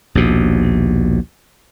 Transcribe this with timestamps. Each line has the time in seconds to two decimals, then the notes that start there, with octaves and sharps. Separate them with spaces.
0.15 A#1 D#2 B2